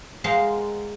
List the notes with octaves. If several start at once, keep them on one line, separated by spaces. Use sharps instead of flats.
G#3 A#4 C5 F5 F#5